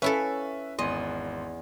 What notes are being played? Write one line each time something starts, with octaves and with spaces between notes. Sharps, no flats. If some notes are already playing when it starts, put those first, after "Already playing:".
C#4 E4 A4 B4 E5 F5 C#6
G#1 E2 D#5 C6